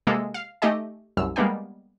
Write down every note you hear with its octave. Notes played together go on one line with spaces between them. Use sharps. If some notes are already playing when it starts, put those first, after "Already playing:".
C3 G#3 A#3 A4
F5
A3 D#4 G4 D#5 G#5
C2 F#2 E6
G3 G#3 A#3 B3 D4 G5